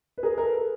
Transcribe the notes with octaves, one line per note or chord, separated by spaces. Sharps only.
B4
G#4 A#4
A#4
A4 B4